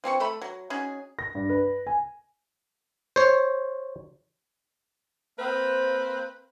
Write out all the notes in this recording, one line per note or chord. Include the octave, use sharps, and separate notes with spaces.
F3 C4 G#4 C#6
A3 A4 B5
F#3
C#4 D#4 F#4 G#4
A#6
G2
B4
G#5
C5 C#5
A#3 C4 B4 C5